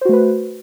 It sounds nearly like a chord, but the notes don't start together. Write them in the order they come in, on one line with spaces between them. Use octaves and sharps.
C5 F#4 A3 B4